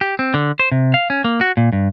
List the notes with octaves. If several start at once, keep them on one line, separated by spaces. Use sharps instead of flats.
G4
C4
D3
C5
C3
F5
C#4
A#3
F#4
A#2
G2